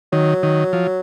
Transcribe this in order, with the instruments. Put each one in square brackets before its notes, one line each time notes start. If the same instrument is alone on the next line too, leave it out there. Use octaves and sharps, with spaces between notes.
[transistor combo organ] D#3 [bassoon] F#3
[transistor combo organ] D#3
F3